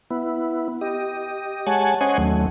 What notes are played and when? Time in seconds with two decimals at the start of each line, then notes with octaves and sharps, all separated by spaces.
0.11 B3 E4
0.81 G4 D#5
1.67 G#3 C#5 F#5 G#5 A5
2.01 C#4 C5 C#5 D#5 F#5 G#5
2.18 D#2 F#3 A3